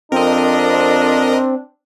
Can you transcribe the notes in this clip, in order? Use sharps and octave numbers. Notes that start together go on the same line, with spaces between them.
F2 C4 D4 A#4 D#5